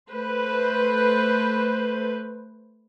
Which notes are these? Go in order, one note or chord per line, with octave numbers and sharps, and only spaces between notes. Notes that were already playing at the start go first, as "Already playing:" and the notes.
A3 B4 C5